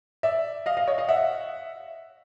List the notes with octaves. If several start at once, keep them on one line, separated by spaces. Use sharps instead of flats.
D5 E5
D#5 F5
D#5 F5
C#5 D#5
D#5 F5
E5 F#5